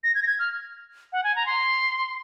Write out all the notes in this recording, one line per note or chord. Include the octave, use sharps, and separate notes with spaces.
A#6
G#6
A#6
G#6
F6
F#5
G#5
A#5
C6